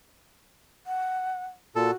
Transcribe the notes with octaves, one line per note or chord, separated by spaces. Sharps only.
F#5
A#2 F#4 A4